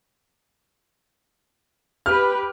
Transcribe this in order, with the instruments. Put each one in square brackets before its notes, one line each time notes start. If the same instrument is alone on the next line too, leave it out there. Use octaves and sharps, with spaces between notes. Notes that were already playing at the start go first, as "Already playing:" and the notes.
[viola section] G4 B4 [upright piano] F6